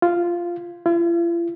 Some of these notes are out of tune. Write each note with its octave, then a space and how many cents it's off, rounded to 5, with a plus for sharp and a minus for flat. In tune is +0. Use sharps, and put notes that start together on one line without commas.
F4 -5
F4 -45